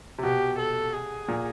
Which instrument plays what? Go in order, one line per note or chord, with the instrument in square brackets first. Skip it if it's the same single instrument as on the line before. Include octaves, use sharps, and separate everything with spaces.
[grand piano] C3
[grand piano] B2 [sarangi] G4
[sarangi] A4
G#4
[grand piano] A#2